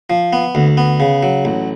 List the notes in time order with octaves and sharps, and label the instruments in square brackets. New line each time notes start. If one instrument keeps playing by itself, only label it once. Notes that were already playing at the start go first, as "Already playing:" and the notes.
[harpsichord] F3
B3
D2
B3
C#3
F#3
A1